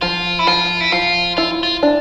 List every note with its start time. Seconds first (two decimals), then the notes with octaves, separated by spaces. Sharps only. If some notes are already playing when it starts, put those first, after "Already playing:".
0.01 F3 F4
0.39 E4
0.47 F3 F4
0.81 E4
0.92 F3 F4
1.37 E4 F4
1.63 F4
1.83 D4